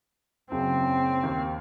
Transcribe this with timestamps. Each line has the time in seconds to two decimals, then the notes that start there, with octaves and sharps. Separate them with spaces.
0.51 F#1 F#2 C#3 C4
1.23 D#2